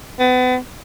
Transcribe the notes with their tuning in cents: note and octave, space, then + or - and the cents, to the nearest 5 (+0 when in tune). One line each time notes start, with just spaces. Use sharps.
B3 +35